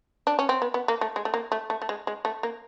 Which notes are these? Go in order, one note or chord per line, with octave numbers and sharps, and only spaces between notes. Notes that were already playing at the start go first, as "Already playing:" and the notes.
D4
C#4
C4
B3
B3
A#3
A3
G#3
A3
A#3
A3
A3
A3
G#3
G#3
A3
A#3